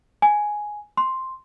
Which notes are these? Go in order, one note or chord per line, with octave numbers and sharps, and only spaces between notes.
G#5
C6